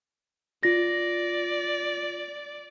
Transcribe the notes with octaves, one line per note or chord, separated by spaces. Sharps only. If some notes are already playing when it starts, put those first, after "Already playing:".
F4 D5 A#6